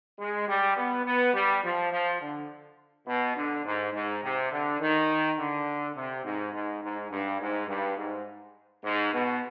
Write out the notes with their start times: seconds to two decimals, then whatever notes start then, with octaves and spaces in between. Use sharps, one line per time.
0.19 G#3
0.48 G3
0.76 B3
1.05 B3
1.33 G3
1.63 F3
1.92 F3
2.20 D3
3.06 B2
3.36 D3
3.65 G#2
3.93 G#2
4.22 C3
4.51 D3
4.80 D#3
5.37 D3
5.95 C3
6.24 G#2
6.53 G#2
6.82 G#2
7.10 G2
7.40 G#2
7.67 G2
7.97 G#2
8.83 G#2
9.13 B2